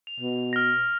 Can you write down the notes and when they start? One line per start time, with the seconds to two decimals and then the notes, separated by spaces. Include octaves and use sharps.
0.07 F7
0.20 B2
0.53 F6 A#6